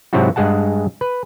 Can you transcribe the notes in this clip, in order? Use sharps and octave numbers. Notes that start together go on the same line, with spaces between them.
G#2 C3 F#3 C4 E4 F#4
G2 G#3 G#4 F#5 A5
B4